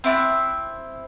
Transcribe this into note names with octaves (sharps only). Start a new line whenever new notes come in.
C4 E4 C#6 F#6